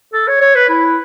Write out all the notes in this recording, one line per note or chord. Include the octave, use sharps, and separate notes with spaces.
A4
C#5
C#5
B4
E4